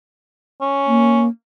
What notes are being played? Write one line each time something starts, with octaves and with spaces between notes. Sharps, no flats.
C#4
A#3